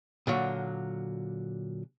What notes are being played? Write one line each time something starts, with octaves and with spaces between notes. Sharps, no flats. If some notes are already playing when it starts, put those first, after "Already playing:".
A#2 D3 F#3